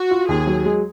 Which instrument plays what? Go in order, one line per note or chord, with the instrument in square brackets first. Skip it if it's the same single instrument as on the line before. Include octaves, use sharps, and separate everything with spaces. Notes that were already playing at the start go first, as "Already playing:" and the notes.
Already playing: [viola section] F#4
[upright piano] F4
[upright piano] D#2 [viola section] G#4
[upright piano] F#3
G#3